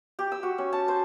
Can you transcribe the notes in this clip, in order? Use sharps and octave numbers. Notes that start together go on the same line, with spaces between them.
G4
E6
F#4
C#4
A5
C5